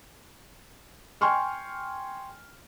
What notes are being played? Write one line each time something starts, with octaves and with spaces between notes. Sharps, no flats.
G5 G#5 C6 C#6 F6